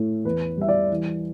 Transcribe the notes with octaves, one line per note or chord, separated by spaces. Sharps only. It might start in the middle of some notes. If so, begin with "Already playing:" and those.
Already playing: A2 A3
E2 B4
G3 E5
D5
E3